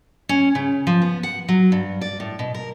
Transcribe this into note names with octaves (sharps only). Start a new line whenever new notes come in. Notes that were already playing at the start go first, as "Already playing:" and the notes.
C#4
C#3
F3
B3
F#5
F#3
G2
D5
A2
B2
A#4